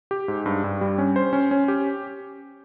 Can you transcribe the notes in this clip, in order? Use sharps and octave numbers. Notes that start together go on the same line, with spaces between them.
G4
G#2
G2
G2
G3
C#4
C5
C#4
C#4
G4